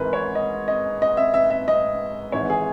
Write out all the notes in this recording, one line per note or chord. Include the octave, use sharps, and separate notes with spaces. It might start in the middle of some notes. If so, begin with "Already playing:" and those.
Already playing: G#1 G#2 E3 A#4 B4
C#5
D#5
D#5
D#5
E5
E5
E5
D#5
G#1 G#2 E3 C#5
G#4